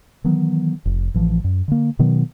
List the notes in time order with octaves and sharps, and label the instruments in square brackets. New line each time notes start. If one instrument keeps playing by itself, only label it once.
[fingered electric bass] D#3 E3 F#3 B3
F1
A1 E3 F3
F#2
D3 A#3
B2 D#3 F#3 B3